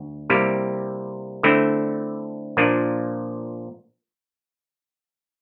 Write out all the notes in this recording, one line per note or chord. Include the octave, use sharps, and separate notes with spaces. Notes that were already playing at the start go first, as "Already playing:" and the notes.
Already playing: D2
C3 G3 A#3 E4 G4
D3 A3 C4 E4
A#2 F3 A#3 D4